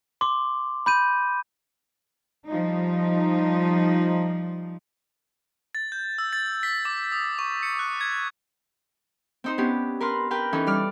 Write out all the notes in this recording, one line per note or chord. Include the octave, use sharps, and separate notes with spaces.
C6 D6
B5 G6 D#7
F3 G3 D#4
A6
G6
E6
A6
B6
D6
D#6
C#6
C#7
F#6
G#6
C4 D#4 C5
B3 C#4 D4 G4
A#4 B4 C6 F6
G4 A#4 B4 G5
E3 C#4 D#4 A4
G3 D5 F6